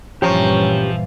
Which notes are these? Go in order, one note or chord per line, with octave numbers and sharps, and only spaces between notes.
G2 A#2 E3 F3 C#4 G4 A#5 C#6